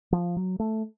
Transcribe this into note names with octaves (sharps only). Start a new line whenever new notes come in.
F3
F#3
A3